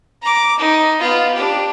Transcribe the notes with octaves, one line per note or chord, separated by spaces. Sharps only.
A#5 D6
D#4
B3 F4
D4 G4